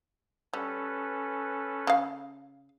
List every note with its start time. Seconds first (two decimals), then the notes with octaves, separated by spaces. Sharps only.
0.53 G3 C#4 A4 B4
1.87 C#3 F5